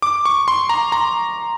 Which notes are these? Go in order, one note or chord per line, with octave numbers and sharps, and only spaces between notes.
D6
C#6
C6
A#5
A#5